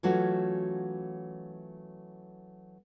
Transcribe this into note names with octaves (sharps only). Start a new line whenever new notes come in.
E3 F#3 A3 C#4 F4 F#4